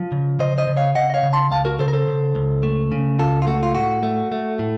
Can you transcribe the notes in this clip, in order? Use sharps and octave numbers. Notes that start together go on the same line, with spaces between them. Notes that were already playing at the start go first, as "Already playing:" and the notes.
Already playing: F3
C#3
C#3 C5 D#5
C5 D#5
C#3
C#5 F5
C#3 D#5 F#5
D#5
C#5 F5
C#3
A5 C6
C#2 F5 A5
F#4 A#4
C#3 A4 C5
A#4
A4 C5
C#3
C#2
A3
C#3
C#2 F4 A4
F4
A3 F#4
F4
A2 F#4
A3
A3
A2